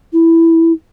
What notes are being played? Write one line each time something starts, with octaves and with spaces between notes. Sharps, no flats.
E4